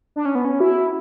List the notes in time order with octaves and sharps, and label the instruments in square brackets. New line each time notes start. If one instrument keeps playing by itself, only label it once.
[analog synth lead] D4
C#4
B3
C#4
[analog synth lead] E4 [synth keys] F#4